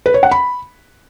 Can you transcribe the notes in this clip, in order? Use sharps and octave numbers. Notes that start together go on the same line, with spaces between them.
B4
C#5
F#5
B5